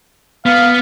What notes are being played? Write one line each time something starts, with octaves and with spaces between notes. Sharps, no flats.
B3 F5